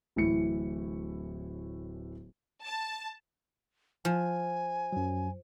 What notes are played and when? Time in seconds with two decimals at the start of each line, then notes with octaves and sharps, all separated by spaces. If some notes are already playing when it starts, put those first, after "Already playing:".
0.16 D1 A2 E3 E4 C#7
2.63 A5
4.05 F3 G#5
4.92 F#2 F#3